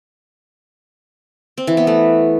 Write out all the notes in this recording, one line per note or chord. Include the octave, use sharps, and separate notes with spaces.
C4
E3
B3
A3